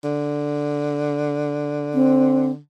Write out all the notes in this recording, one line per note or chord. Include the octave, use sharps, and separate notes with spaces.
D3
C4